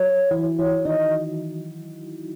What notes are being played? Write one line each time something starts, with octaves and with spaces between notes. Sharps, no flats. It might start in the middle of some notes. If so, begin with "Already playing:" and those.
Already playing: F#3 F#4 C#5
E3 E4
E3 E4 C#5
D#3 D#4 D#5